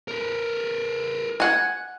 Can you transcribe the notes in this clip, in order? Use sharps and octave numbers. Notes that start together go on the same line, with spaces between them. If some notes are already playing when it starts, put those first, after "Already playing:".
A#4 B4
F#5 G#5